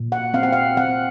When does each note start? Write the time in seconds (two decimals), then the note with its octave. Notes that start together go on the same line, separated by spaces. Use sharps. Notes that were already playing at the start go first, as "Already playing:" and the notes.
Already playing: A#2
0.12 F#5
0.34 C4 F5
0.43 F#5
0.53 F5
0.77 C4 F#5